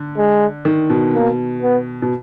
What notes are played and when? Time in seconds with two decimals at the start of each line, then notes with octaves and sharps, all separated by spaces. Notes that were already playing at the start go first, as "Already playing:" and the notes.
Already playing: D3
0.17 G#3
0.65 D#3
0.90 B2
1.14 A#3
1.62 B3
2.02 B2